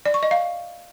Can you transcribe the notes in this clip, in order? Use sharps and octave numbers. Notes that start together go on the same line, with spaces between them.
D5
C#6
D#5
F5